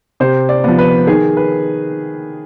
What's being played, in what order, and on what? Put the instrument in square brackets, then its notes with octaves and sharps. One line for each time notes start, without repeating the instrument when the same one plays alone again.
[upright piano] C3 C5
D5
F3 B3
B4
D#3 G#4
B4